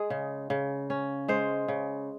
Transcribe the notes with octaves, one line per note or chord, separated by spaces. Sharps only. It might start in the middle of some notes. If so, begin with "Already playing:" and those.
Already playing: G#3 G#4
C#3
C#3
C#4
G#3 C5
C#3